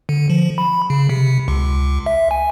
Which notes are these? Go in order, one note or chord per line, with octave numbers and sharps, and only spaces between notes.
D3
F3
B5
C#3
C3
C#2
E5
G#5